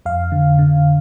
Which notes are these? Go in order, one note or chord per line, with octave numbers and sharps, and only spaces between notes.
F2 F5
D3
D3